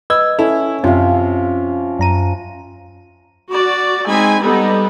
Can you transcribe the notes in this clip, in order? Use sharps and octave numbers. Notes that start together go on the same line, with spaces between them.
B4 D#5 E6 G#6
C#4 E4 A4
F#2 C3 F3 C#4 F5
F#2 A#5 D#7
F#4 D5
G#3 C4 D#4 G#5 B5
G3 B3 D#4 A4